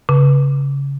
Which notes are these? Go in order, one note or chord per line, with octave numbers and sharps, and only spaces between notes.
C#3